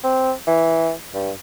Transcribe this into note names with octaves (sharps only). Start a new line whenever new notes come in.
C4
E3
G2